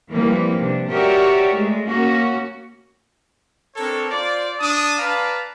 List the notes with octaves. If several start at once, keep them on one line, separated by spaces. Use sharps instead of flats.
E3 F3 G3 A#3 C4 B4
C3 D4
F#4 G4 A#4 C#5 D5 E5
G#3 A3
A#3 C#4 F#4
C4 D4 A4 A#4 C#5
F4 C5 D5
D4 A5 D#6
B4 D5 F5 A5 A#5